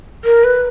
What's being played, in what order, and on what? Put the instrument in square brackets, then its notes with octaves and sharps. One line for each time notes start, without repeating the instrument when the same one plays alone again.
[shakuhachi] A#4
B4